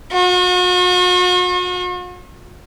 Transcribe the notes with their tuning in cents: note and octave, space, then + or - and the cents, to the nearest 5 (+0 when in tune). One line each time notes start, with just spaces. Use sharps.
F#4 -45